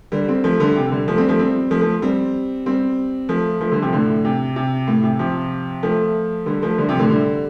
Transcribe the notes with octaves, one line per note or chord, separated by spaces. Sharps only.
D3 G3
G3 C4
F3 A3
D3 G3
C3
D3 G3
F3 A3
G3 C4
F3 A3
G3 C4
F3 A3
F3 A3
G3 C4
G3 C4
F3 A3
F3 A3
D3 G3
C3 F3
A2 D3
C3
C3
A2
C3
C3 F3
F3 A3
D3 G3
F3 A3
D3 G3
C3 F3
A2 D3
D3 G3